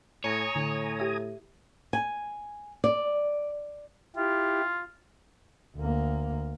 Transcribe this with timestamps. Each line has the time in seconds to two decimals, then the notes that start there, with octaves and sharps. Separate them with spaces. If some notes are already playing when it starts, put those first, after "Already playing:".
0.24 A2 C#5 G#5 A#5 D#6
0.56 A2 D3
1.00 G4 E5
1.93 G#5
2.84 D5
4.16 E4 F4 G4
5.77 D2 A#3